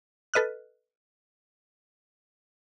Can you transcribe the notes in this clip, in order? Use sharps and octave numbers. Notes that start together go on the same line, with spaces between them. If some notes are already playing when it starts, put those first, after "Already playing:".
A4 B4 D#5 F6 F#6